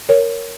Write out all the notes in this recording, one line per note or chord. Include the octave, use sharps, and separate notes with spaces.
A#4 C#5